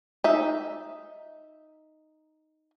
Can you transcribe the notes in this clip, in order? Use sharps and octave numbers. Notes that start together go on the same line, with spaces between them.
D#4 E5